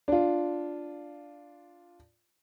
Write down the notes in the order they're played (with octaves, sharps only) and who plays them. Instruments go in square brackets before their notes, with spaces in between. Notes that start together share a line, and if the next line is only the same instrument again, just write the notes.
[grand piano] D4 F4